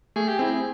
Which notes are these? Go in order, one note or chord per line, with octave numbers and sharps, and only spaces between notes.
A3 G#4
G4
C4 E4 G#4